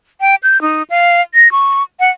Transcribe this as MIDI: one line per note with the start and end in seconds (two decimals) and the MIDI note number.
0.21 0.35 79
0.43 0.61 91
0.62 0.83 63
0.90 1.22 77
1.35 1.51 94
1.52 1.83 85
2.00 2.10 78